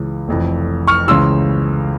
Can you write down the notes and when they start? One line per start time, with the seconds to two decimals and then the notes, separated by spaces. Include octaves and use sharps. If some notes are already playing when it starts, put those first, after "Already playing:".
Already playing: C#2 C#3 E3
0.28 F1 F2 E3
0.87 C#6 F6
1.08 C#2 C#3 E3 C6 E6